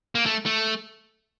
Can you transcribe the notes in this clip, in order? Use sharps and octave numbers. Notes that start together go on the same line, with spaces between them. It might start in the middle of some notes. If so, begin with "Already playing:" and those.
A#3
A3
A3